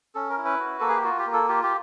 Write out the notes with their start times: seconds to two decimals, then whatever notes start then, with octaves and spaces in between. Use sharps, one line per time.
0.15 C#4 A4
0.30 A#4
0.37 E4
0.45 B4
0.60 F#4
0.80 A#3 A4
0.88 G#4
0.96 G4
1.04 F4 F#4
1.19 G4
1.27 A#3
1.33 A4
1.49 F4 G4
1.63 G4